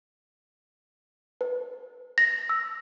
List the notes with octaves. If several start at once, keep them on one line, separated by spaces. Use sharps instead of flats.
B4
A#6
E6